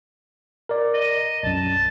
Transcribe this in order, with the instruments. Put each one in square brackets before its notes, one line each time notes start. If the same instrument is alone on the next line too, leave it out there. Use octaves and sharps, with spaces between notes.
[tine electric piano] A#4 D5
[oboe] D#5
[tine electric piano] B1 F#2 [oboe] A5